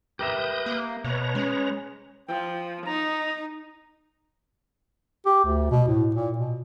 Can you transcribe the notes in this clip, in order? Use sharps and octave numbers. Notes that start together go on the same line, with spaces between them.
G4 A#4 B4 E5 D#6 G6
A#3
B2 B4 C#5 A#5
G#3 C#4
F3 G5
D#4 A#5
G4
D2
B2
A2
A#2
B2